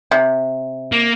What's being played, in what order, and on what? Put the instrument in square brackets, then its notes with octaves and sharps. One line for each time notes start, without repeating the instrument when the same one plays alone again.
[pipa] C3
[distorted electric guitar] A#3